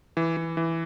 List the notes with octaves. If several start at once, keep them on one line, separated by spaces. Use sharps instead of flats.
E3
E3
E3